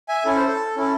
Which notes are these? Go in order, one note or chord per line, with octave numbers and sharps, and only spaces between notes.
E5 G#5
C#4 E4 A4
C5
A4
C#4 E4 A4